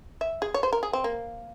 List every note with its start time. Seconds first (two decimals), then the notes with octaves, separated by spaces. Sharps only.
0.21 E5
0.42 G#4
0.54 C#5
0.63 C5
0.73 A#4
0.83 G#4
0.93 C4
1.04 A#3